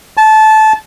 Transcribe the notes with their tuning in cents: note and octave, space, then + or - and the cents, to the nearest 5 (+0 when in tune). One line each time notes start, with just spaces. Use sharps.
A5 -20